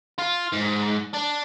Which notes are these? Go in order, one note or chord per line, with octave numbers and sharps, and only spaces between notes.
F4
G#2
D4